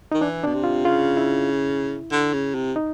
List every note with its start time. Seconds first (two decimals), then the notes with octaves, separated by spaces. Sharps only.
0.12 D#3 D#4
0.21 E3 D4
0.44 B2 D4
0.54 C3
0.64 F4
0.85 C#3 F4
1.17 E4
2.12 D3
2.33 C#3
2.54 C3
2.76 D#4